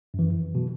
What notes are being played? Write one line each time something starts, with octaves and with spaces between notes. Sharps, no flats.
F#2 E3
B2 F#3